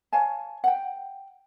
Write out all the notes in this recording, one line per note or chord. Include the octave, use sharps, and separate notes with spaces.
C#5 F5 G#5 A5
F#5 G5